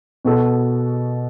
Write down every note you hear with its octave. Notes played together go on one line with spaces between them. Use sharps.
B2 B3 F#4 A4